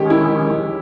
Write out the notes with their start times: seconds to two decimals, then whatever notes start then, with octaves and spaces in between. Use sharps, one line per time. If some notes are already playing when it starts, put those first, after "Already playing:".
Already playing: D#3 G#3 C#4 G4
0.10 E4